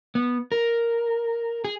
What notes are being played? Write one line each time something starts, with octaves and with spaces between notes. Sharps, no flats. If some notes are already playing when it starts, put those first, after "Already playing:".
B3
A#4
G#4